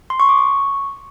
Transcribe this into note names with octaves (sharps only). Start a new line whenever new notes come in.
C6
C#6
D6
C#6